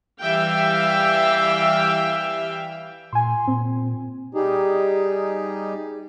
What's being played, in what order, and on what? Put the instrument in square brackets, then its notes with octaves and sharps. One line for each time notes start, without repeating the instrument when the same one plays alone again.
[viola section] E3 G3 E5 F5 G5
[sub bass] A#2 [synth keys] G#5 C6
[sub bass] A#2 [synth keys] C4
[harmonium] G3 D#4 G4 G#4